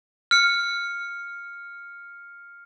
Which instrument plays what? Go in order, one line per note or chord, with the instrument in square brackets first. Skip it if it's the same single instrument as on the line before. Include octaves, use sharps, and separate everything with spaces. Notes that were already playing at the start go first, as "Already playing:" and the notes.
[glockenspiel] F6 C#7